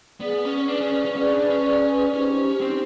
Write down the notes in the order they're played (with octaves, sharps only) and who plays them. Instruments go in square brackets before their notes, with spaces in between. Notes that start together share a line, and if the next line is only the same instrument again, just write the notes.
[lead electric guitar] B3 [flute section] G#4 B4 D5
[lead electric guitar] C#4
[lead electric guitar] D4 [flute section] G#4 B4 D5
[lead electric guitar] C#4
C#4
C#4
[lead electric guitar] C#4 [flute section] G#4 B4 D5
[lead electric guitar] D4
C#4
[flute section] G#4 B4 D5
[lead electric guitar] C#4 [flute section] D#4 G4 C5
[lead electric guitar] C4 [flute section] D#4 G4 C5